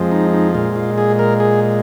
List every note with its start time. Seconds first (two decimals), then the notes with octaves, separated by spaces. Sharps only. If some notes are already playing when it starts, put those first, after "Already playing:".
Already playing: F2 F3 G#3
0.12 D#4
0.33 D#4
0.55 A#2 G#3 F4
0.76 F4
0.98 G#4
1.19 A#4
1.40 G#4